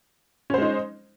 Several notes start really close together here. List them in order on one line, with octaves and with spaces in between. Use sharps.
C#4 C5 G#3 D#4